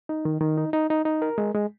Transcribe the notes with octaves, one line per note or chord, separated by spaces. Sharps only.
D#4
D#3
D#3
D#4
D#4
D#4
D#4
A#4
G#3
G#3